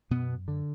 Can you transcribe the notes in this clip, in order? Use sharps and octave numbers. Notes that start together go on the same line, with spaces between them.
F#2 B2 B3
D3